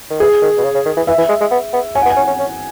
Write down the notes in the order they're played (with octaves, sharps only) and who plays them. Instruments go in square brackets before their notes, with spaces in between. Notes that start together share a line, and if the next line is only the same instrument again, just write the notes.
[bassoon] D#3
[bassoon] E3 [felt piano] G#4
[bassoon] D#3
B2
C#3
C#3
D#3
E3
[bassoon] E3 [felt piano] E5
[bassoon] E3
G#3
G#3
B3
B3
[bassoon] C#4 [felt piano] G#5
[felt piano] F#5
[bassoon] B3
[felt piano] G#5
[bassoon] C#4
C#4
C#4